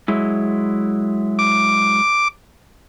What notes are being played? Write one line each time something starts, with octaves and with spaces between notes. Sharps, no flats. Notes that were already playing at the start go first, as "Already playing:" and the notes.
F#3 G#3 E4
D6